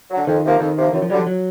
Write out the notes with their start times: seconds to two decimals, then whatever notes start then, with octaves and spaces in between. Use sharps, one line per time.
0.11 D3 F#3
0.27 F2 D#3
0.44 C3 F3 A#3
0.60 F2 D#3
0.77 C3 F3 A#3
0.93 F#2 E3
1.02 F3
1.10 D3 F#3 G3
1.18 F3
1.27 F#3